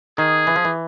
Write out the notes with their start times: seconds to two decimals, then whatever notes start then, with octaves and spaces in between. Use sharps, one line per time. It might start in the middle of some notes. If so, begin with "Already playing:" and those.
0.18 D#3 G#4
0.47 E3
0.56 F3
0.65 E3